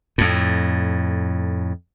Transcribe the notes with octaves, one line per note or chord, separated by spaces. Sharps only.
F2 A2